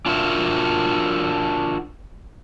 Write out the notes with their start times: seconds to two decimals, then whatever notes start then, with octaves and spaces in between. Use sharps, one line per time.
0.06 D4 F4 F#4 A#4 E5